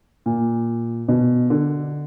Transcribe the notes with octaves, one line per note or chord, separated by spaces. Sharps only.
A#2
B2
D3